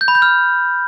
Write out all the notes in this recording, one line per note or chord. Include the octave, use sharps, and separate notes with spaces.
G6
B5
G6
F6